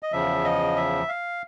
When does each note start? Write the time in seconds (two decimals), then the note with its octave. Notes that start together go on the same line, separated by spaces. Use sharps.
0.03 D#5
0.12 E2 C#3 F3 E5
0.44 D#5
0.77 E5
1.08 F5